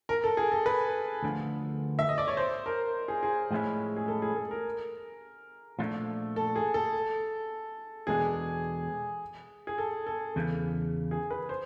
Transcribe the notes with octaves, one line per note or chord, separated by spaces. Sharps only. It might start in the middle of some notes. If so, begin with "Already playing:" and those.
A#4
A4
G#4
A4
B4
D2 D3 F3
E5
D#5
D5
C#5
C5
A#4
G#4
G#4
A2 F3 G#3 C#4 E4
G#4
A4
G#4
A4
A#4
A#2 F3 A3 D4
A4
G#4
A4
E2 B2 G#3 B3 D4 G#4
G#4
A4
A4
E2 C#3 E3
G#4
B4
C5